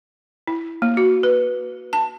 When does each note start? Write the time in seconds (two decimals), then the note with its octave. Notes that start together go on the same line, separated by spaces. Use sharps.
0.47 E4
0.82 A#3
0.97 F#4
1.23 B4
1.93 A5